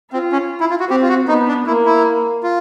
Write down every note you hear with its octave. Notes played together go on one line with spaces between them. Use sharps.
C4 F4
C#4
E4
F4
F#4
C4 G4
F4
F#4
B3 D#4
D4
A#3 E4
E4
F4